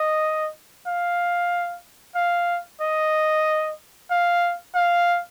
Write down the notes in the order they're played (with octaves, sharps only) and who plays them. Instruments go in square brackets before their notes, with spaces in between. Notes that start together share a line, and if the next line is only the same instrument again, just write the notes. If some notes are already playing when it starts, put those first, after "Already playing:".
Already playing: [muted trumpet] D#5
F5
F5
D#5
F5
F5